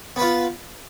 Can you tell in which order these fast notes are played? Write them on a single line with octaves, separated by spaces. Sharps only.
B3 B4 F4